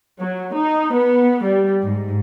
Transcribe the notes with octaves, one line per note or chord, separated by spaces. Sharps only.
F#3
D#4
B3
G3
G#2